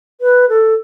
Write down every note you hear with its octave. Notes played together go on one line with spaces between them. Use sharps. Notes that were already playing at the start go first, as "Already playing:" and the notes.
B4
A4